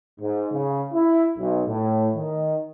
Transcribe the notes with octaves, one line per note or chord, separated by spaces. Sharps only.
G#2
C#3
E4
B1
A2
D#3